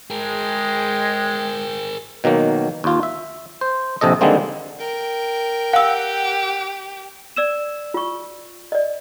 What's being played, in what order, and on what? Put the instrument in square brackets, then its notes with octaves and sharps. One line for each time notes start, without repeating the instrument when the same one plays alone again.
[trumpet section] G#3 [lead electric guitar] G#4 A#4 [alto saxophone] G5
[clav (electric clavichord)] B2 D#3 F#3 A#3
D#2 F4
E5
C5
A#1 C3 A4 D#5
D3 D#3 G3 G#3 A#3 C4
[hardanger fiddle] A#4 G5
[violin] G4 [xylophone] F5 E6 [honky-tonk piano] F#5
[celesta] D5 E6 E7
[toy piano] F4 C#6
D5 D#5